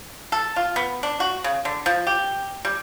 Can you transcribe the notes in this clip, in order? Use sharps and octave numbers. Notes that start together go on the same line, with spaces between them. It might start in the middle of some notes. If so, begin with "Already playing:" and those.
A4
F4
B3
D4
F#4
C#3
D3
F3
G4
G3